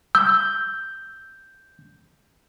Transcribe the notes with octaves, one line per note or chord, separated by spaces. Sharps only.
E6 G6